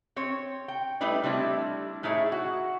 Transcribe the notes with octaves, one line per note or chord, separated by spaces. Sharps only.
C4 C#5
G5
G3 A3 D#4 E4 B4 D5
G3 A3 C4 D4 E4
A2 A3 D#4 E4 G#4 C#5
F#4